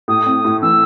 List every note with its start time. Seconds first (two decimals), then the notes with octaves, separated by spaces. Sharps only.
0.08 A2 D#6
0.26 C4
0.45 A2
0.62 E3 E6